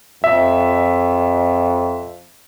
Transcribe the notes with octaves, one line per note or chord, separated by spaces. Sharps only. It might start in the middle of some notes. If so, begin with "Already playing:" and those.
F2 E5